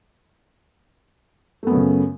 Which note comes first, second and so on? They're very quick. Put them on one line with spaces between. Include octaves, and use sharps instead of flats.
A3 B3 F#2 C#3